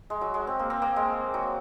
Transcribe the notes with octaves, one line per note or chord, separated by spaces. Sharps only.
G#3
F#3
G#3
C4
A#3
C4
A#3
G#3
F#3